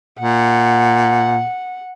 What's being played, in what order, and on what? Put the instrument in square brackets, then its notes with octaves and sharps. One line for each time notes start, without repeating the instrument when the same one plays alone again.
[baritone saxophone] A#2 [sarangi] F#5